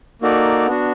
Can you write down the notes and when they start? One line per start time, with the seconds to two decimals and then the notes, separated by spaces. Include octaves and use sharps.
0.22 A#3 D#4 F#4 A4 D5
0.66 B3 D4 F#4